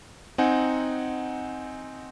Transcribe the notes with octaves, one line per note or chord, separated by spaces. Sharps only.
C4 D#4 F#5 G#5